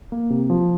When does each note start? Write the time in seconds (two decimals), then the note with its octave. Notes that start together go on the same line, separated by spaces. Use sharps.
0.12 A#3
0.30 C3
0.50 F3